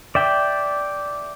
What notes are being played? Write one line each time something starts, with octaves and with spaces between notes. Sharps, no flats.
D5 E5 G5